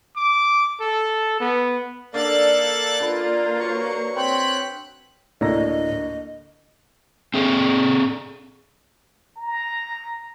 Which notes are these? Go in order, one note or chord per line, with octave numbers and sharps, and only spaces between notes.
D6
A4
B3
D3 A#3 D4 A4 D5 F5 F#6 A6
D3 F4 B4
F#3 C#6
C4 C#5 G5 B5 C6 F#6
D2 A2 A#3 D4 D#5 A#5
C4 G#4 A4
A#5